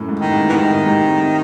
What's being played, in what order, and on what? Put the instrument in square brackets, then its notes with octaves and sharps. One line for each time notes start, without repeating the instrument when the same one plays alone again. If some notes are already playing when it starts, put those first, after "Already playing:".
Already playing: [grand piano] F#2 A2
G#2
[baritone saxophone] D#3
[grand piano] G#2 C3
[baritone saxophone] E3
[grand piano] G#2 C3 [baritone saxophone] D#3
[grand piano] G#2 C3
C3